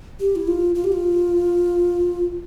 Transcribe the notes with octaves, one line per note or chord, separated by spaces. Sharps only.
G4
E4
F4
F4
G4
F4